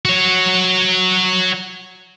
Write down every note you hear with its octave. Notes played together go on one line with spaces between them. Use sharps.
F#4 C#5